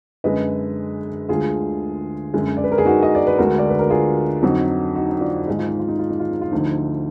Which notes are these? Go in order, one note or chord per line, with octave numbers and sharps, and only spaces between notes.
F#2 D3 G#3 B4 D#5
D2 D3 G#3 F4 G#4
F#2 D3 G#3
D5
B4
A#4
G#4
D#4 F#4
D#5
D5
B4
D2 D3 G#3 F#4 A#4
D5
B4
A#4
F4 G#4
F2 D3 F#3 D#4 F#4
D#4 F#4
D#4
D4 F4
G#2 D#3 G#3 D#4
F4
D#4
F4
D#4
F4
D#4
F4
D#4
F4
D2 D3 F3 D#4